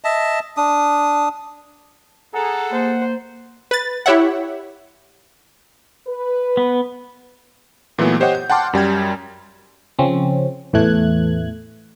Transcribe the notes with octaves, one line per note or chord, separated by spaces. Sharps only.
D#5 E5 A5
D4 D#6
G#4 A4 F#5 A#5
A#3 C5
B4 A6
E4 G4 C#5 E5 F#5
B4
B3
A#2 E3 F#3 A3 B3
G4 C5 C#5 D#5 F#5 G5
G6
F#5 G5 A5 C6 D6 F6
F#2 G3 G5 G#6
C#3 F3 C4 C#4
E2 A2 E3 A3 F#6 G#6